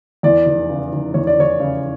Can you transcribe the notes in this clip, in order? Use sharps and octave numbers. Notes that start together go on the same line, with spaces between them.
E2 D5
F1
C#3
F1
E2 C#5
D5
F1 C#5
C#3